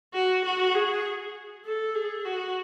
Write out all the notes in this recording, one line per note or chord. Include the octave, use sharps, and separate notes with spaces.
F#4
F#4
G#4
A4
G#4
F#4